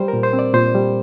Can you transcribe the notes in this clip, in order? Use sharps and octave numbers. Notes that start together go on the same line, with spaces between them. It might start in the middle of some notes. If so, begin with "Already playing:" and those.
Already playing: G3 C5
A#4
A#2
C5
C4
D5
A#2 C5
G3